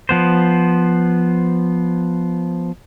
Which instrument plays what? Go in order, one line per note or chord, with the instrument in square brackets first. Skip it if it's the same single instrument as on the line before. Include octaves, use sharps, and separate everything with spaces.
[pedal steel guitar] F3 B3 C5